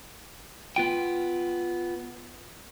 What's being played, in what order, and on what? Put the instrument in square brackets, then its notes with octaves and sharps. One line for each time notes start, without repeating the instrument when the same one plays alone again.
[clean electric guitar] B3 F4 G5